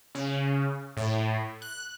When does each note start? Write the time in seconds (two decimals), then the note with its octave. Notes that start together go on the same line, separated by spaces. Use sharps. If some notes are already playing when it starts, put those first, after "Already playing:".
0.15 C#3
0.97 A2
1.62 F#6